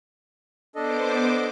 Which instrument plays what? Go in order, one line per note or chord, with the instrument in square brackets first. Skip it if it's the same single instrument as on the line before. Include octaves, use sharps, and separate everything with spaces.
[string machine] B3 C5 D6 [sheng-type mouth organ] D4 A4 D#5